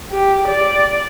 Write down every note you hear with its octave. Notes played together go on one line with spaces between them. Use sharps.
G4
D5